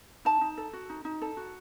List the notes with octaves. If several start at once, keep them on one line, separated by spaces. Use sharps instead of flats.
D#4 A5
D#4
A4
F#4
D#4
D#4
A4
F#4